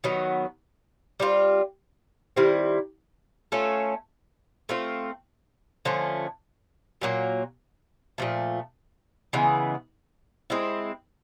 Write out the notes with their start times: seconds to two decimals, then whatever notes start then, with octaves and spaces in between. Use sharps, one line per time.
0.04 D#3 F#3 B3
1.20 G3 C4 F4
2.36 D#3 G3 C4 E4
3.52 A3 C#4 F4 A4
4.69 A3 C4 F4
5.85 D3 F3 A3 C#4
7.01 A#2 F#3 A#3
8.18 A#2 F3 A3
9.33 C#3 E3 G#3 B3
10.50 G#3 C4 E4